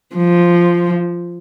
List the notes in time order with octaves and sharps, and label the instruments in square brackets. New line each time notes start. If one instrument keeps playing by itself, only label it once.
[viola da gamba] F3